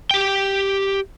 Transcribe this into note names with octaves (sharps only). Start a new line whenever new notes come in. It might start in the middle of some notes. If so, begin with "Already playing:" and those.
G4 G5